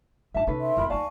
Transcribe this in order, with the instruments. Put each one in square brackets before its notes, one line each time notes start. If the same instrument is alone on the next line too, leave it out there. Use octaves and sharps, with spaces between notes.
[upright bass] G2 D#4 [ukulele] E5 A5
[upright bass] C3 D#4 [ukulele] C#4 A4 B4
[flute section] E5 C6
[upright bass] F2 A#3 [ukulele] E4 A#4 B5
[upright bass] D#2 F4 [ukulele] D5 F5 A5 [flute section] G#5 C#6